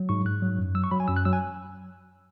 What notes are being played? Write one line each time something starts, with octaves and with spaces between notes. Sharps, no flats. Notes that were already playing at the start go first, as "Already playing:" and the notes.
Already playing: F#3
G#2 C#6
G#2 F#6
F#3
F#2
F#3 E6
C#6
F#3 B5
G#5
F#2 E6
F#6
F#3 E6
G#5